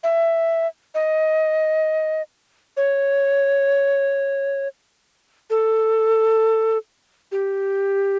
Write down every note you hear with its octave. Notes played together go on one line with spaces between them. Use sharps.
E5
D#5
C#5
A4
G4